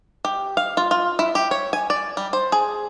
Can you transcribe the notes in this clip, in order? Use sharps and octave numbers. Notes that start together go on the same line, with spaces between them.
G4
F5
F4
F4
E4
G4
C#5
G#5
D5
G3
C5
G#4